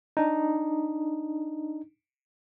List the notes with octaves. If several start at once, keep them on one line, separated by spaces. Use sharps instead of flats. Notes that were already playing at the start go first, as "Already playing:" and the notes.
D4 D#4